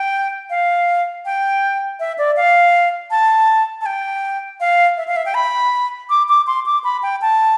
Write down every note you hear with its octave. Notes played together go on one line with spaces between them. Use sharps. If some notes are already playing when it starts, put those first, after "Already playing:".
Already playing: G5
F5
G5
E5
D5
F5
A5
A5
G5
F5
E5
F5
E5
G5
B5
D6
D6
C6
D6
B5
G5
A5